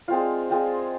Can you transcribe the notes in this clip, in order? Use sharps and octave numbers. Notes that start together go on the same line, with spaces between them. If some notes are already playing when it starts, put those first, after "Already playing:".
G#3 C4 F4
G#3 C4 F4